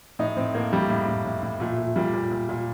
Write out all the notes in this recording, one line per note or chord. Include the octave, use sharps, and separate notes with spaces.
A2 D#4
A2 C4
A2 A#3
A2 G3
A2
A2
A2
A2
A#2 A3
A#2
A#2 G3
A#2
A#2
A#2